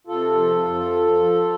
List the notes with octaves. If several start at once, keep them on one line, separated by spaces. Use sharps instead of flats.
C3 F4 A4
F3
F2
F3
F3